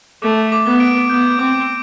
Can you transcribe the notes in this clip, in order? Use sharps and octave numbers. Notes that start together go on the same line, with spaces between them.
A3 D6
D6
B3
D7
B3 G6
C4 D6